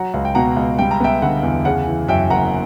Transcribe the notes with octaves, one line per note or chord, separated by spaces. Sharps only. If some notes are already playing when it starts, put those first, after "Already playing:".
Already playing: F#3 F#5 A#5
C#2
G5
B2 F#5 A#5
C#2
G3 G5
A#5
B3 E5 G5
D3 F#5
E2
C#3 F#5
E3
F#2 E5 G5
F#1 F#5 A#5